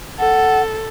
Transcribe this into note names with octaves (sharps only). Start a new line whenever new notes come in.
A4 F#5